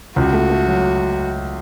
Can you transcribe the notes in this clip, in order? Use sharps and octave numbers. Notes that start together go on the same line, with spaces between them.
C#2 F#4
A3
A3
F#3